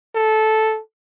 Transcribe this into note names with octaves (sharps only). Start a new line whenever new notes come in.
A4